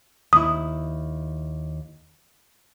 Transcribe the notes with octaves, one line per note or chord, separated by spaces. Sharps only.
D#2 E4 D#6